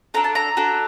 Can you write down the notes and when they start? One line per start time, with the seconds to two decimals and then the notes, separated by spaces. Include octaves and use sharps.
0.14 D4 F#4 A4 A#5
0.24 A5
0.35 A#5
0.57 D4 F#4 A4